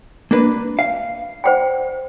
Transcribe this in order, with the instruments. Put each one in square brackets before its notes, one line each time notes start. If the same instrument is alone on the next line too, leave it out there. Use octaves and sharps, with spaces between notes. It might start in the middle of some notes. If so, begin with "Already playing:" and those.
[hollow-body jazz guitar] A#3 D4 B4
F5
[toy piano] C5 F#5 G5